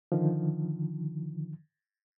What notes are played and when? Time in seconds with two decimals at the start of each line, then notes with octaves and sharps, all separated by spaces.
0.12 D3 D#3 F3